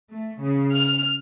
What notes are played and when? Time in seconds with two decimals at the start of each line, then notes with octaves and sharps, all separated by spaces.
0.12 A3
0.41 C#3
0.72 F6